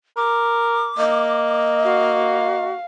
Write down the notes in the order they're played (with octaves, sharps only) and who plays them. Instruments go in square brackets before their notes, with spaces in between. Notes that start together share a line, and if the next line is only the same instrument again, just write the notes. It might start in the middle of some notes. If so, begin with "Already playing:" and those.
[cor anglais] A#4 [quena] D6
[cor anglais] A#3 [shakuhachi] D#5
[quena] F#4 [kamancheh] F5